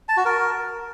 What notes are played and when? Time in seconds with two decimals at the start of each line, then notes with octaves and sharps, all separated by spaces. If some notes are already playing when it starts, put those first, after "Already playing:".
0.09 A5
0.17 F#4
0.25 A#4